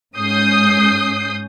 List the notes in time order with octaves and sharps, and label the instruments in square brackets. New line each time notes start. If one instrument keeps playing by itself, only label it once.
[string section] G#2 C#4 D#6 G6 C7